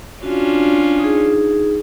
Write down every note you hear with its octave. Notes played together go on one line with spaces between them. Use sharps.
C#4 D4 F4 F#4
D#4 G#4